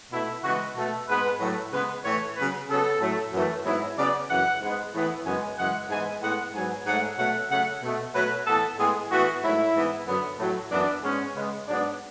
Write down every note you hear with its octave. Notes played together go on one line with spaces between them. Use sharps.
B2 A3 E4
C#3 E3 G#3 B3 F#4
B2 A3 A4
G#2 G#3 B3 B4
A2 F#3 A3
C#3 G#3 B3 B4
A2 E3 A3 C#5
C#3 F#3 B3 B4
C#3 F#3 B3 A4
A2 F#3 A3
F#2 E3 A3
G#2 F#3 B3 E4
C#3 F#3 B3 D5
F#2 C#3 E3 F#5
G#2 G#3 B3
A2 E3 B3
F#2 C#3 G#3 B3 G#5
F#2 C#3 E3 G#3 F#5
G#2 E3 G#3 B3 G#5
A2 G#3 B3 F#5
G#2 F#3 B3 G#5
G#2 F#3 A3 F#5
B2 F#3 A3 F#5
C#3 F#3 A3 F#5
B2 A3
B2 F#3 A3 B4
A2 E3 B3 A4
A2 G#3 B3 G#4
A2 E3 B3 F#4
G#2 F#3 A3 E4
G#2 E3 B3
F#2 D3 F#3 B3
A2 F#3 A3
F#2 E3 B3 D4
G#2 G#3 B3 C#4
C#3 G#3 B3
G#2 F#3 B3 D4